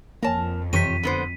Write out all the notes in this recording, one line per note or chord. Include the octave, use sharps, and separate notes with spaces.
F2 A#3 A#4 C#5 G#5 A5
F#2 C3 E3 G4 C#5 G6 B6 D#7
D3 B3 C5 B5 C#7